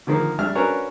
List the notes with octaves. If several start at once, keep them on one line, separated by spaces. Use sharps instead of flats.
D3 D#3 F3 A#3
G3 D4 E5 F6
C#4 D4 F#4 A#4 B4 C#5